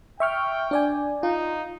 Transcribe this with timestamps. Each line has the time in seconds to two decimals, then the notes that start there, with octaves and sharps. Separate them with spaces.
0.20 E5 G5 C#6 F6
0.71 D4 D5 G#5
1.23 D#4 F4